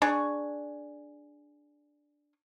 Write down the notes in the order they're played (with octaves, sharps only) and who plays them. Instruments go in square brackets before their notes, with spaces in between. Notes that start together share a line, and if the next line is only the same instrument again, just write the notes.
[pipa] D4 G#4 C#6